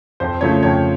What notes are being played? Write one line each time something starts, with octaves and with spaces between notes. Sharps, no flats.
F2 C5
C#3 F3 A3 C#5
F2 C#5